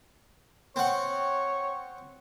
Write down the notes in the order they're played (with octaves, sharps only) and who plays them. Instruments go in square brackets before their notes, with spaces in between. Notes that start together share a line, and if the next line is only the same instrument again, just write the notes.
[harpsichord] C4 F#5 [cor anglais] C#5